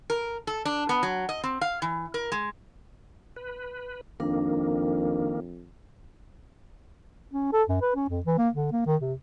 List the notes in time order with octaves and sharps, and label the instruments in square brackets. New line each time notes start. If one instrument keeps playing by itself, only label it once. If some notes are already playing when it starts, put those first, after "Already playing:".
[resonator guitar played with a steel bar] A#4
A4
D4
B3
F#3
D#5
C4
F5
E3
A#4
G#3
[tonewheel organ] B4
[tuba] F2 [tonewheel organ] D#3 A#3 [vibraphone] D4 A#4
[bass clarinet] C#4
A4
F#2
B4
C#4
F2
E3
A#3
D3
A#3
D#3
C3